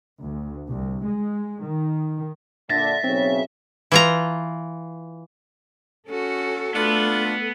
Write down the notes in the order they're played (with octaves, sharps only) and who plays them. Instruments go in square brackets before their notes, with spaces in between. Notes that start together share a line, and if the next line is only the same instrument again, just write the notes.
[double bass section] D2
C2
G#3
D#3
[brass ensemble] A#2 D3 [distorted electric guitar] E5 [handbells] A6 A#6
[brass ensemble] B1 C#3 C#5 [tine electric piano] C4
[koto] E3 F4 A#5
[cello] C#4 F#4 [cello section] A4
[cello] A3 [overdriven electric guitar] B3 B4 [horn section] D4 F4